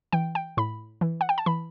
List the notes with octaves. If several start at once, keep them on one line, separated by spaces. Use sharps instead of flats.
E3 G5
G5
A2 B5
E3
F#5
G5
A5
E3 B5